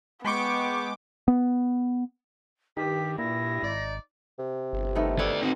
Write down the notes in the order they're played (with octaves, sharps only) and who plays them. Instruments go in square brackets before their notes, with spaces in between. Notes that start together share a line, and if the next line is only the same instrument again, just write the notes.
[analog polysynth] G#3 G5 D6 [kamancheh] B3 [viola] C#6
[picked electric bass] B3
[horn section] G2 [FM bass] D#3 [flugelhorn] G4 [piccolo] B6
[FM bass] A#2 [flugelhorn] E4 [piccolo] A#6
[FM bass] G#1 [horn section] D#4 D5
[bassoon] C3
[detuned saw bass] G1
[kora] D#3 A3 B3
[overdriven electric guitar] A3 D5 [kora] A4 B4 C#5
[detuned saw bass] C4 [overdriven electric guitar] D#4 F#4